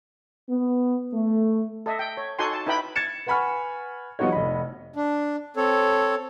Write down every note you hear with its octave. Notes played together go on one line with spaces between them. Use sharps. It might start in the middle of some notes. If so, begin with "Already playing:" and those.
B3
A3
A4 D#5 E5
G5
C#5
D#4 F#4 A4 F#5 G#5 C6
A5
D#4 E4 B4 G5 B5
G#6 A6 C#7 E7
B4 F#5 G#5 B5 C#6 F6
F3 G3 B3 D#4 F#4 C#5
F1 D#5 B5
D4
C4 A4 C#5